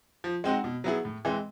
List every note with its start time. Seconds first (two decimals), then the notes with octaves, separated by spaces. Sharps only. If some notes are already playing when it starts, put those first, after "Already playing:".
0.24 F3
0.44 G#3 C4 D#4 F#4
0.64 B2
0.84 F#3 B3 E4 G#4
1.05 A2
1.25 E3 G#3 C4